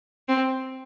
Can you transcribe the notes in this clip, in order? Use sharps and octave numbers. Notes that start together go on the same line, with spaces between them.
C4